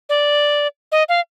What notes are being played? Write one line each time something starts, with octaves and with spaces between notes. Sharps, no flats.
D5
D#5
F5